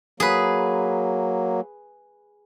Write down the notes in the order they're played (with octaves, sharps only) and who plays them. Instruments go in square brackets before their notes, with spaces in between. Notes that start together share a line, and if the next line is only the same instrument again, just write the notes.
[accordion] F#3 A#3 [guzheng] G#4 B4